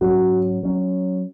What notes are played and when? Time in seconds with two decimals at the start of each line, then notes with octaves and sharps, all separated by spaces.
0.01 G#2 F#3 C#4 F#4
0.63 F#3 C#4